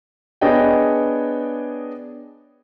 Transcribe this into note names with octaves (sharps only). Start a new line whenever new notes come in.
B3 D4 G#4 C#5 D#5 G5